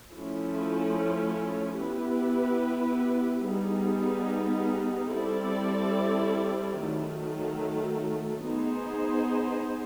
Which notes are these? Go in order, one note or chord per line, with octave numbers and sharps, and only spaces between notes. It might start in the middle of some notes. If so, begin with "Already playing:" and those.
F3 A3 C#4 E4
B3 E4 G4 B4
G3 B3 D#4 G#4
G3 C4 E4 A4 D5
D#3 F#3 A3
B3 D#4 G#4 C5